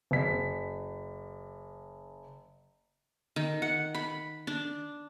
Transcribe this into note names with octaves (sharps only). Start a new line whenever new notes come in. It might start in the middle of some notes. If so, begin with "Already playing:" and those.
F#1 B6
D#3
F#5
B5
D4